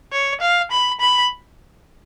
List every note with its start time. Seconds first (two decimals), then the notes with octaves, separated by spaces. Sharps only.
0.13 C#5
0.41 F5
0.71 B5
1.01 B5